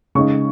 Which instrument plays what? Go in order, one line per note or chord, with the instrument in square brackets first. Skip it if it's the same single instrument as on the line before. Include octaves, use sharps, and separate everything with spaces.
[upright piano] C#3 G#3 D#4 C#6